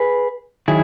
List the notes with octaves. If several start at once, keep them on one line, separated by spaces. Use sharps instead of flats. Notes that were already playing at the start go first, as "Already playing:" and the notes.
Already playing: G#4 B4
D#3 F#3 E4 G#4